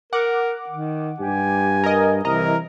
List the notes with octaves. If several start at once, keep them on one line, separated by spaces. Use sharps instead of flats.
A#4 F#5 D6
D#3
G2 G4 G#5
A#4 D#5
C2 E3 A#4 D#5 A#5